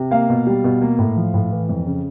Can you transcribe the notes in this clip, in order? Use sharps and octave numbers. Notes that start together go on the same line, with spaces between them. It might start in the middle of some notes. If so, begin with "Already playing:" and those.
Already playing: C3
A#3 F5
B2
G3
B2
A#3
A2
F3
A2
E3
F2
C#3